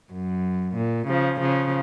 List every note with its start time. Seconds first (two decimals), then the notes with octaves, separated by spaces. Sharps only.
0.11 F#2
0.76 A#2
1.08 C#3 F3
1.40 C#3 F3